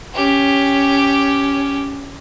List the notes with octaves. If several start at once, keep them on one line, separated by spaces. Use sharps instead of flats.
C#4 G4